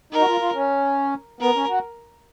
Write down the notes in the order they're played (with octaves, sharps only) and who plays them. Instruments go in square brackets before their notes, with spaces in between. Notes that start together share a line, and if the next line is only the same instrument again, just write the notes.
[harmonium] D#4 [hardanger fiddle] A#4
[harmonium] F#4
F4
F4
C#4
[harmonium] B3 [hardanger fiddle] A#4
[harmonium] C#4
F#4